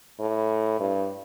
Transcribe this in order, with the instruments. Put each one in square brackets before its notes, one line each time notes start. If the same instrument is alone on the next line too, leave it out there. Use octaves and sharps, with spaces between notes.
[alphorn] A2
G2